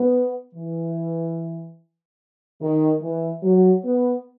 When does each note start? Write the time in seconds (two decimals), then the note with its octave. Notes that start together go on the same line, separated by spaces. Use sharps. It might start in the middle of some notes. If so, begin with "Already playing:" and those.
Already playing: B3
0.55 E3
2.61 D#3
3.02 E3
3.43 F#3
3.84 B3